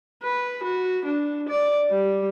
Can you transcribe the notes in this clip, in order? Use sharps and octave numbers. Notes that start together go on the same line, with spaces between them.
B4
F#4
D4
D5
G3